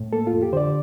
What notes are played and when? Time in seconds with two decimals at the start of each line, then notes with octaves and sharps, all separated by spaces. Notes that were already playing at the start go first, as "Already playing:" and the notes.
Already playing: A2
0.13 A#3 A4
0.27 F4
0.33 F2
0.43 G4
0.53 D3 C5
0.57 D5